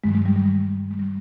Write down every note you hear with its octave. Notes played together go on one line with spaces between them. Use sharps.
G2 D#3 F#3 G#3
G#3
G3
G3
G#3
G3